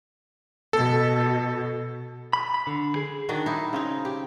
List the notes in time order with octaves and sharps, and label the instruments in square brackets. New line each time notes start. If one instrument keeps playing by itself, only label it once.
[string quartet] B2 [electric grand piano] A4
[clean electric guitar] B5
B5
D3
G#4
[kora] D#3 D4 F#4
D#4 E4
C#3 C4 D#4
G4